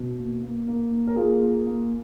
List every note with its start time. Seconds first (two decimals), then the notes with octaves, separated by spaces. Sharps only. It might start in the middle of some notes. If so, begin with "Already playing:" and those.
Already playing: B2
0.18 A#3
0.42 A#3
0.67 A#3
0.92 A#3
1.07 A#4
1.16 A#3 F4 G#4
1.41 A#3
1.66 A#3